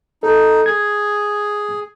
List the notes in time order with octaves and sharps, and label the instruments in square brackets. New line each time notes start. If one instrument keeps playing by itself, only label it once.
[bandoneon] D#4 [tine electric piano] A4
[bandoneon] G#4 [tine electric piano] G#6